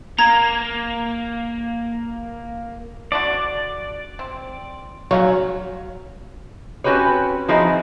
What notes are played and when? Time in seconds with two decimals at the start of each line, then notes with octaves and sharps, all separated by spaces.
0.19 A#3 A#5 G#6
3.12 D3 D4 F#4 D5
4.19 C4
5.11 C#3 F#3 F5 C#6
6.84 C4 C#4 F#4 G4 B4 C#5
7.48 F3 C4 D#4 E4 F#4 G#4